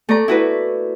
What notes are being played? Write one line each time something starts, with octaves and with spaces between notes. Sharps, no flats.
A3 D5 A#5
E4 F#4 B4